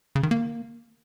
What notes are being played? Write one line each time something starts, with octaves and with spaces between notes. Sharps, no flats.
C#3
D#3
A#3